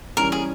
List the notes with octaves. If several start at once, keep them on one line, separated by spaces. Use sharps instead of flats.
E3 G3 C#4 A#4
G#4